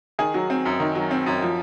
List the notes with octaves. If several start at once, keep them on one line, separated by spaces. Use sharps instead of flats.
D#3 G#4
F#3
C4
F#2
D#3
F#3
C4
F#2
F3